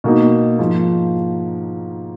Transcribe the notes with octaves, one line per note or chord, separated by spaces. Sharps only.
B2 A#3 D#4
G#2 F3 A#3